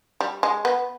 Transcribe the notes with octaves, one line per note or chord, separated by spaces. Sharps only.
G3
G#3
B3